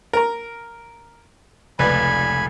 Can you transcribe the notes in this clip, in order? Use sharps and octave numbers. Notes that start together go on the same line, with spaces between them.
A#4 A#5
F1 C#2 B4 D5 G#5 B5